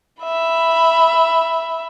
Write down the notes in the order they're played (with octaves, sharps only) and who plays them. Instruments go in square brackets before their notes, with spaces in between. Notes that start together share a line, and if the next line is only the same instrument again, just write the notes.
[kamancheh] E5 B5